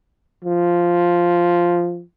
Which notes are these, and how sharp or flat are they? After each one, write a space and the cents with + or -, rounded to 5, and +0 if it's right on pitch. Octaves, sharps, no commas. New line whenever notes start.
F3 +0